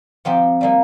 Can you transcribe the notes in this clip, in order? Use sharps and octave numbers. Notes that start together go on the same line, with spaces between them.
F3 C4 D#4 G4
G3 A#3 D#4